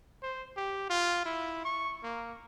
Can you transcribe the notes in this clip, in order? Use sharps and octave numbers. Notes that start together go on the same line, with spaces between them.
C5
G4
F4
E4
C#6
A#3